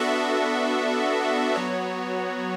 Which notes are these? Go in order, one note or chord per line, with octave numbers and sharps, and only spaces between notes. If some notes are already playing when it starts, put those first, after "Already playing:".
Already playing: B3 D4 F#4 A4 E5
F#3 B3 F#4 C#5